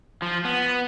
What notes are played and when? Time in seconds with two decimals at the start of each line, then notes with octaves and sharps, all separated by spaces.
0.22 F3
0.45 B3